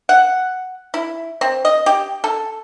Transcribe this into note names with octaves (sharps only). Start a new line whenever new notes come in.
F#5
E4
C4
D#5
G4
A4